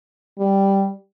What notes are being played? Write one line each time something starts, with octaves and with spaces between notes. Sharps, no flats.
G3